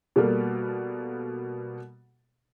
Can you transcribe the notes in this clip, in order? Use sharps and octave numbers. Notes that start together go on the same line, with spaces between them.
B2 G3 A#3 A4